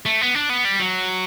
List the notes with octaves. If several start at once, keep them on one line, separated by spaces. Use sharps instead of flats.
A3
B3
D4
B3
G3
F#3